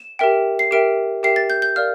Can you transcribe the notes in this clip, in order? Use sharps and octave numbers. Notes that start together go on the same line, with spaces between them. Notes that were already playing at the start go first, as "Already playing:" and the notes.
Already playing: E7
G4 A#4 E5 G5
C7
G4 A#4 E5 G5 D7
G4 A#4 E5 G5 C7
A6
G6
G6
A#4 D5 F5 F6